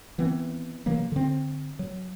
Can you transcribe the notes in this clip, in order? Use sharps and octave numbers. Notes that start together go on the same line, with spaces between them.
D#3 E3 B3 C4
C3 E3 F#3 A#3
D3 C4
F#3